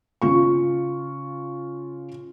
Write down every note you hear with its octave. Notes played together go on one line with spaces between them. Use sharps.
C#3 F4 C#6